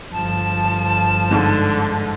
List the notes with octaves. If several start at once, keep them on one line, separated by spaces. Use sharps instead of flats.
G1 F3 A5
G#2 D3